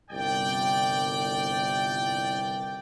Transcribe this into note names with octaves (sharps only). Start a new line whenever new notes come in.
G1 C2 D5 G5